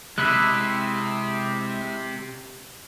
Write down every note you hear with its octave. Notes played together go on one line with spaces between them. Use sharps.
C3 G#3 E4 E5 F#6